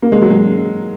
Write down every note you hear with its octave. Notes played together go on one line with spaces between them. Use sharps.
A#3
G#3
F#3
G#3